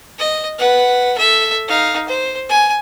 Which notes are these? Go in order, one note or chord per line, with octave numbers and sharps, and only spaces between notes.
D#5
B4 F#5
A4 E5
D#4 F5
C5
G#5